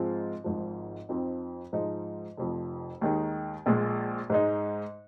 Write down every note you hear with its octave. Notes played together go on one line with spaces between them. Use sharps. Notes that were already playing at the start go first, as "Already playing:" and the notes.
Already playing: G#2 F3 G#3 C4 F4
G#1 G#2 F3
F2 F3 C4 D#4
G#2 F3 G#3 D#4
F1 F2 F3
D#2 D#3 G#3 D#4
A#1 A#2 G#3
G#2 G#3 D#4